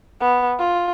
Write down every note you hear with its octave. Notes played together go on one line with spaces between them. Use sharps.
B3
F4